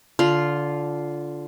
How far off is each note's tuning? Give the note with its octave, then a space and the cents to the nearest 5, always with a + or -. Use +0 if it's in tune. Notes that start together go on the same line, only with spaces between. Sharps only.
D3 -15 F4 +0